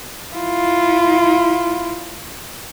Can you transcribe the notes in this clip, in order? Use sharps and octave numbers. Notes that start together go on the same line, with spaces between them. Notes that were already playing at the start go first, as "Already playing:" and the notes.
E4 F4